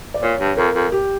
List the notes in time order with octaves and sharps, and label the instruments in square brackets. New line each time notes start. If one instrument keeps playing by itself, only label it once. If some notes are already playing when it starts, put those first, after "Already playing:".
[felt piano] D5
[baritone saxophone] A#2 [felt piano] C#5
[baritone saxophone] G2
[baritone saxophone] F2 [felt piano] A#4
[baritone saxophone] F2
[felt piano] G4